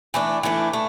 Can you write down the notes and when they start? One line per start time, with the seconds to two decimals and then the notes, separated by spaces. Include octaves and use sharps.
0.14 E3 A3 D4
0.43 E3 A3 D4
0.73 A3